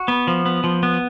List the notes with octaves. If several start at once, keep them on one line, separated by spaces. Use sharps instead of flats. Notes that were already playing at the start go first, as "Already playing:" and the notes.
Already playing: F#4
B3
F3
B3
F3
B3